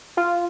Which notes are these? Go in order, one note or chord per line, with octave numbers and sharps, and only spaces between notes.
F4